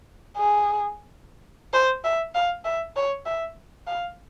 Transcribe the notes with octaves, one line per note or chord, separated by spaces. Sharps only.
G#4
C5
E5
F5
E5
C#5
E5
F5